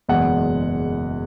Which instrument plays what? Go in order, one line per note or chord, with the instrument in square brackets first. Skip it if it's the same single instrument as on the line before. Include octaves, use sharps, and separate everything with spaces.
[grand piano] F#1 E2 B2 G#3 F#5